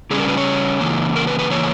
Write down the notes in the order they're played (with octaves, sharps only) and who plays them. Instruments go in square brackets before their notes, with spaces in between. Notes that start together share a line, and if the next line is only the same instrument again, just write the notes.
[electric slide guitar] C#3 G3 C#4 G#4
A#4
B4
C#5
C#3 E3 A#3
A#4
B4
B4
C#3 E3 A#3 C#5